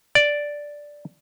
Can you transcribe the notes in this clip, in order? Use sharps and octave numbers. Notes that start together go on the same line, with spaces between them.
D5